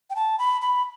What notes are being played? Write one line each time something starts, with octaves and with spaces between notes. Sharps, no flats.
G5
A5
B5
B5